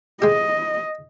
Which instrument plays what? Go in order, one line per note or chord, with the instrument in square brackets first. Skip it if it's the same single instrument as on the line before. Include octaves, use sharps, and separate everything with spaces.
[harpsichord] G#3 G4 [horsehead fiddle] D#5